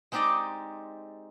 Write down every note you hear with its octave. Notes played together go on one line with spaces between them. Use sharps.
G#3 C4 D#4 G4 D5 D#5